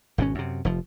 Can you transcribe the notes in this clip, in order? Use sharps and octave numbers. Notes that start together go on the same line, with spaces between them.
G#1 B2 D3 C#4
F#2 C3
F1 F3